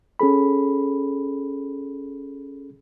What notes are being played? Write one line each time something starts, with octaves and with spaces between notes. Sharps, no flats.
C#4 G#4 A4 B5